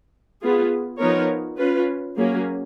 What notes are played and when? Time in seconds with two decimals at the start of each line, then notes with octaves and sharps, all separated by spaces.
0.42 B3 F4 G#4
0.99 F3 B3 D#4 A#4 C#5
1.58 C#4 F4 B4
2.16 F#3 A#3 C#4 G#4